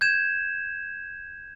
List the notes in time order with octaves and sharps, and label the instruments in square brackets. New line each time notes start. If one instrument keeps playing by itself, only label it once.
[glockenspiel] G6 G#6 E7